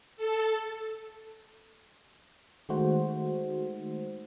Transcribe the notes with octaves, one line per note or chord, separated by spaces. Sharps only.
A4
D#3 G#3 A3 D#4 F#4 C5